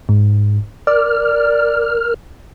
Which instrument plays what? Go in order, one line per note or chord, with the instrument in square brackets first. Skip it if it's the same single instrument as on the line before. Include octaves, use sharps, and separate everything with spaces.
[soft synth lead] G#2
[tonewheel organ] A#4 F6 [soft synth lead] D5